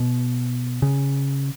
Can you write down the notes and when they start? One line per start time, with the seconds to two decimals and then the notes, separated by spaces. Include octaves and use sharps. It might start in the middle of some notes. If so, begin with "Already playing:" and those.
Already playing: B2
0.82 C#3